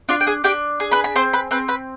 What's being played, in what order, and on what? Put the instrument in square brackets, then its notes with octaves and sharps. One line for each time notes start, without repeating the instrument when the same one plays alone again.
[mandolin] D4 F4 F5
G5
G#4 G#5
D4 G4 G5
G#4
B4 B5
B5
C4 C5 C6
B4 B5
C4 B4 B5
B4 B5